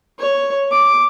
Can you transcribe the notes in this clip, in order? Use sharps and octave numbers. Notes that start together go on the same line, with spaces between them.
C#5
D6